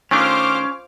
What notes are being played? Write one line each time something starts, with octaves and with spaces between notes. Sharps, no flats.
D#3 A3 C#4 D4 F4 C5 D6 F6